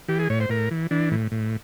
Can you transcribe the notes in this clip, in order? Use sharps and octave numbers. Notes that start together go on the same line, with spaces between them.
E3 G4
G#4
A2 C#5
C5
A2 A#4
E3
E3 D4
A2
A2